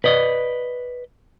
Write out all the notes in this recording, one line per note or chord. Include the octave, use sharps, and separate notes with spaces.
B4 D5 D#5